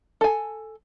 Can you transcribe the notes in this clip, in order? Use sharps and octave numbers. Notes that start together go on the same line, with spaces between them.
A4 G#5